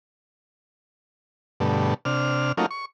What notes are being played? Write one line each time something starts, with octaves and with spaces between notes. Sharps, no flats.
G2 B2 D3 A3
C3 D4 F6
F#3 A3 A#3 C#4 D#4 F4
C#6